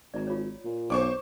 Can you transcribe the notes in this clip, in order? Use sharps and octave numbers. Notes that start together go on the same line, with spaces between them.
G#1 D5 A#5
F4 C#5
A#2
B1 C5 D5 C#6 D6